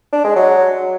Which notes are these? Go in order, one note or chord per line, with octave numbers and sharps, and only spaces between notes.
D4
G#3
F#3